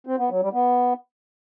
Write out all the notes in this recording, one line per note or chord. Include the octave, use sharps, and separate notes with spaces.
C4
B3
F#3
G3
B3